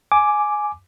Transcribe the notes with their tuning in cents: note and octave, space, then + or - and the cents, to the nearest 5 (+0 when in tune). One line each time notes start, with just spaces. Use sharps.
G#5 +10 D6 +0